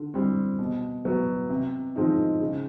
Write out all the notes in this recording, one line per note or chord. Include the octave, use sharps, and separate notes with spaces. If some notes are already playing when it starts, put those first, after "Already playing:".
Already playing: D3
G3 C4
B2
F#3 B3
C3
F3 G#3 C4 D#4
C#3